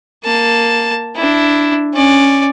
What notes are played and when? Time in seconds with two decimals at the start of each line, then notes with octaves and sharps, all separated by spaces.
0.25 A#3 A5
1.15 D4 E4
1.94 C#4 D5